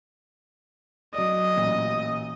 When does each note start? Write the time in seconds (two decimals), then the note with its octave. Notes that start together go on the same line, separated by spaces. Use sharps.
1.14 F#3 D5 D#5
1.57 A1 A#2